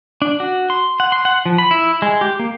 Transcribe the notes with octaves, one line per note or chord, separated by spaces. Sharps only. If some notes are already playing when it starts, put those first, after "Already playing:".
D4
F#4
C6
F#5
C6
F#5
F3
B5
E4
G#3
G4
A#3